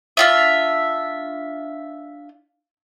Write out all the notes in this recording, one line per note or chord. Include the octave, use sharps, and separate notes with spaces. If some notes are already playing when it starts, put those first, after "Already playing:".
D4 F4 E5